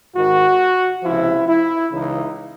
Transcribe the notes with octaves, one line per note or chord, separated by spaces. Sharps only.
G#2 D#3 F#4
C#2 C3 F3 E4
E4
C#2 C#3 E3 D#4